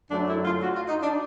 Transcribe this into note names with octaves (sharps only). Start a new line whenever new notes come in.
F#2 D3 F#3 A3 D4
E4
F4
F#4
F4
D#4
D4